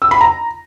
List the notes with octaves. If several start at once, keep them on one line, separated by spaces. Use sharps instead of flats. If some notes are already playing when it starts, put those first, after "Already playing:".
E6
B5
A#5